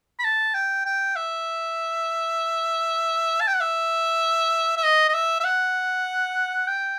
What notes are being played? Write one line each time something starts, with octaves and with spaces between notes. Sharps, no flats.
B5
A5
G5
G5
E5
A5
G5
F#5
E5
E5
D#5
D#5
E5
E5
F#5
G5